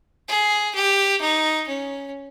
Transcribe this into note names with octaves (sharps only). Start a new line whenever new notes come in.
G#4
G4
D#4
C#4